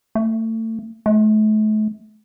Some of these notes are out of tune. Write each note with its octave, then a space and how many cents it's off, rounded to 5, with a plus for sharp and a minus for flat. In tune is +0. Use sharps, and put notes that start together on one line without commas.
A3 +30
A3 -40